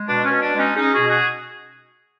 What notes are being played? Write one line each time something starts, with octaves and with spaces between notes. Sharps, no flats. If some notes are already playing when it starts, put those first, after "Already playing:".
Already playing: G#3
B2 D4
C#4
B2
D4
G#3 C#4 D#4
G#3 C#4 D#4
F#4 G#4
B2
F#4 G#4